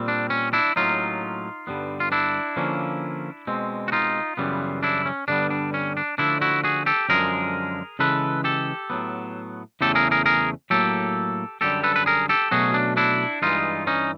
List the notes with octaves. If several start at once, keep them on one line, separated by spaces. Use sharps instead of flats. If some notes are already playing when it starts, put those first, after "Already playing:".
Already playing: A#2 G3 C4
D4
C#4
D4 E4
A2 F#3 A#3 C#4 D#4 F4
G2 D3 G3 B3
F4
D4 E4
D3 F3 A#3 C#4
B2 G#3 C4
F#4
D#4 F4
F#2 C#3 E3 G3 B3
D4 E4
C#4
G2 D3 G3 B3 D4
D4
C#4
D4
D3 F3 A3 C#4 D4 E4
E4 F#4
F#4 G#4
G4 A4
F#2 D3 F3 G#3 G#4 A#4
C#3 E3 G#3 A4 B4
G4 A4
A2 F#3 B3
E2 C#3 E3 A3 G4 A4
G#4 A#4
G#4 A#4
G#4 A#4
A2 F#3 A#3 G4 A4
F#2 D3 G3 G4 A4
A4 B4
B4
G#4 A#4
G4 A4
B2 F#3 A3 C#4 F#4 G#4
D4
D4 E4
G2 E3 G#3 D#4 F4
C#4 D#4